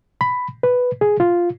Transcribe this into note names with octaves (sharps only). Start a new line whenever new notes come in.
B5
B4
G#4
F4